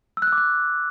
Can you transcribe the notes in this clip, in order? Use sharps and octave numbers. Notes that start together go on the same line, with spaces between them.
E6
F#6
E6
D6
F#6